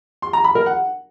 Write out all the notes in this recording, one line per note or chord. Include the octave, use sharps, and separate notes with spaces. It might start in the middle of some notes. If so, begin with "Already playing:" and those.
C6
A#5
B5
A#4
F#5